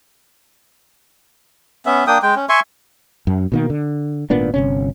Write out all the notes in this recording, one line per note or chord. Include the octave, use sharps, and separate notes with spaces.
B3 C#4 E5
A#3 D4 G5 D#6
G#3 G5
C#4
E5 G#5 C6 C#6
F#2
B2 D#3 A#3
D3
G#1 A#2 B3 D4
G1 C3 C#4